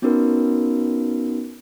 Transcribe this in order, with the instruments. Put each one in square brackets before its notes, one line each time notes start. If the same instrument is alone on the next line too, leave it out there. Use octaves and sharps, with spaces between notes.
[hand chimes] B3 C#4 D#4 F#4 A#4 B4